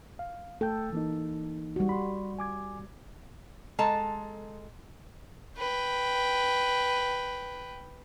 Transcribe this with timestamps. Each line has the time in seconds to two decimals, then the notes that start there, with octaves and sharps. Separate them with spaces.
0.19 F5
0.61 A3 A4 G5 G6
0.92 E3 A#3 D#4
1.76 G3 F#4
1.89 B5 C6
2.39 G#5 D6 G#6
3.79 G#3 A4 A5 A#5
5.57 B4 G5